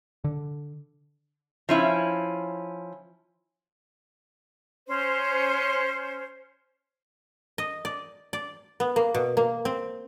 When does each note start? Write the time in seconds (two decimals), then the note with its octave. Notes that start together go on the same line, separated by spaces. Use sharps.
0.24 D3
1.69 F3 C#4 E4
4.87 C#4 C5
7.58 D#5
7.85 D5
8.33 D5
8.80 B3
8.96 A#3
9.14 B2
9.37 A#3
9.65 C4